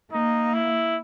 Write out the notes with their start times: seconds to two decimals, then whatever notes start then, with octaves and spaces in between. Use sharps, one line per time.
0.12 A#3 D#4
0.54 E4